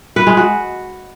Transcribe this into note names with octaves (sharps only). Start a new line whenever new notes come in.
B4
G#3
F#4